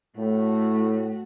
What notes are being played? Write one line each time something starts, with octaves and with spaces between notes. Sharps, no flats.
A2 A3 F#4